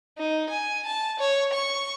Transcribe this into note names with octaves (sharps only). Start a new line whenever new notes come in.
D#4
G#5
A5
C#5
C#6